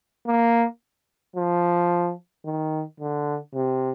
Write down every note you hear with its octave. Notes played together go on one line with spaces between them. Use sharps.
A#3
F3
D#3
D3
C3